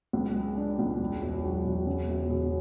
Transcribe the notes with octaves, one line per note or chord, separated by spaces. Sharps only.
C#2
G#3
D4
C#2
E1
E1
F#3
E1
C#3
E1
E1